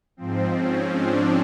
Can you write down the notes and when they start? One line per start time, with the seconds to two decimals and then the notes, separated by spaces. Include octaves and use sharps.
0.17 G#2 F3 C4
0.56 C#4
0.94 D4